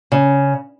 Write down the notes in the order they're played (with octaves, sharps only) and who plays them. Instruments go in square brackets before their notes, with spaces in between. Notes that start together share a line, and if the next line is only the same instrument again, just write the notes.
[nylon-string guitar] C#3